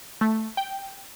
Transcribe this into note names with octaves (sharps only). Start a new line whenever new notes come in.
A3
G5